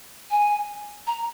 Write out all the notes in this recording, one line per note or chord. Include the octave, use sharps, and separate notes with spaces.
G#5
A#5